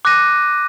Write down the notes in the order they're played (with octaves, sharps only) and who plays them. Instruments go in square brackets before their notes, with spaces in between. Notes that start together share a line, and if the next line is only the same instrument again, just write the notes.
[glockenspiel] D6 F#6 A#6 D#7